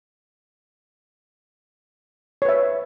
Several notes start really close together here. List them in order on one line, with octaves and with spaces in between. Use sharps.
C#5 B4 E5